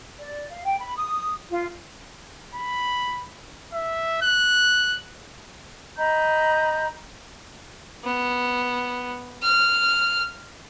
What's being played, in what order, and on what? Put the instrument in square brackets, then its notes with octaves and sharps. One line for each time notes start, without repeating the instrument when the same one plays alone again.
[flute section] D5
F5
G5
B5
D#6
F4
[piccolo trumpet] B5
E5
F#6
[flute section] D#5 A#5 B5 G6
[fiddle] B3
F6